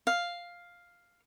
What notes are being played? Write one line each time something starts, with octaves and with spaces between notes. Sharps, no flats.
F5